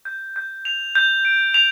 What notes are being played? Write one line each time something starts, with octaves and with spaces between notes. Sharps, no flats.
G6
G6
F7
G6
D7
F7